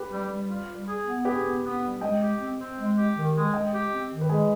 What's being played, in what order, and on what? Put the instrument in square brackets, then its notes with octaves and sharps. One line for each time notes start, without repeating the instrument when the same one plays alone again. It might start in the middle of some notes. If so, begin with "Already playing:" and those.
Already playing: [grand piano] G4 B4
[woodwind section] G3
G3
F4
G3
G#4
B3
[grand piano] G4 B4 [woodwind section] G#4
[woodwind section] B3
B3
G3
[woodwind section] G#3 [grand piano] D#5 G5
[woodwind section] G4
C4
C4
G#3
G4
D#3
G#3
[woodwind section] G#3 [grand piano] D#5 G5
[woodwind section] G4
C4
D#3
[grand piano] B4
[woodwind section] G#3 [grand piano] G#4